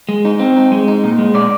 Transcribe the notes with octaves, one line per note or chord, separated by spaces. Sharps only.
G#3
D#4
C4
D#4
G#3
D#4
A#2
G#3
A#2 D5